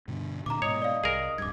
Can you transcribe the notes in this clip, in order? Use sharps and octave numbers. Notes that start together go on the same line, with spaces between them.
G2 B2 D3
A#2 D3 A#5 D6
G#2 B2 C#5 D#5
D5 F5
C2 G#4 A#4
D1 G2 D6 G#6